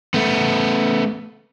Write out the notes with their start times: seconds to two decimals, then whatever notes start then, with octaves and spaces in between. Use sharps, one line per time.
0.14 A3 B3